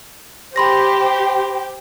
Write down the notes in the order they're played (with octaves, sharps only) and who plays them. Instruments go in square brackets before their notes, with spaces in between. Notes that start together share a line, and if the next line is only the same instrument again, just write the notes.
[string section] G4 C5 [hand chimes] B5 C6 A#6